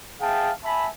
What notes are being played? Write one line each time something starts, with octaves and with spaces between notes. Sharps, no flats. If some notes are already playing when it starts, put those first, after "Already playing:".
G#4 E5 F5 G5 A5
E5 G#5 A5 B5